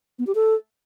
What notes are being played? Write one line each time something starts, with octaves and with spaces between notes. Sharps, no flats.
B3
G4
A4